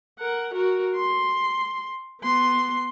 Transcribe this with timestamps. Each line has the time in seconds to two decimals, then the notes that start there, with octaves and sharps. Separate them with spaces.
0.19 A#4 F#5
0.54 F#4 A#4
0.95 C6
2.21 B3 C6